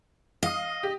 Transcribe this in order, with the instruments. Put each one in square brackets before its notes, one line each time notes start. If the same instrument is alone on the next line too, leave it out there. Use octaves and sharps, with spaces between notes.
[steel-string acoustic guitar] D#5 [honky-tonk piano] F5 D#6
[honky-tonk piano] G4